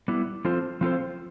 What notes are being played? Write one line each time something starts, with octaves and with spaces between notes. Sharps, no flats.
G3 B3 E4
F3 C4 F4 A4 C5
F3 C4 F4 A4 C5